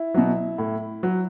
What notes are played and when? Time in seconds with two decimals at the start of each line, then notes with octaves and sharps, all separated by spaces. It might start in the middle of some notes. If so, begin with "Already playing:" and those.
Already playing: E4
0.14 B2 F#3
0.58 A2
1.03 F#3